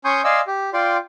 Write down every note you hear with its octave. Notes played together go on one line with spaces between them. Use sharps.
C#4 G#5 C6 C#6 D#6 G6
D5 D#5 F5 G#5 C6 E6
G4
F4 D5 G5 C6